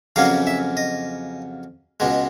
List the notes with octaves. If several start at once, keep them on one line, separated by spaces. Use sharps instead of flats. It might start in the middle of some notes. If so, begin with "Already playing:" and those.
F2 C#3 F#3 A#3 C#4 F5
E5
D#5
C#2 B2 G#3